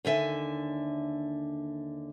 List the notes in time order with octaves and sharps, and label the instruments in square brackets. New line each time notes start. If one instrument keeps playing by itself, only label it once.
[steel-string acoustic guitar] D#2 D3 E5 G#5